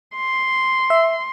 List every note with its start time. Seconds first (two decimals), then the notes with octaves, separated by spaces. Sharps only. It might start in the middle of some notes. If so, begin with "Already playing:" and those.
0.16 C6
0.90 E5